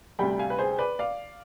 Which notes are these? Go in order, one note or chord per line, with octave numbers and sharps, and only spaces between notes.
D2 C3 G3 G5 B5
F5 G#5
B4
G#4 C5
B4 D5
D5 F5